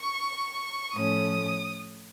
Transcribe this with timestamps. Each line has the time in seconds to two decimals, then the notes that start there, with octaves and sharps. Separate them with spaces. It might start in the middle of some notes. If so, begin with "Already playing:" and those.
Already playing: C#6
0.94 A2 F3 A3 C#4 D#6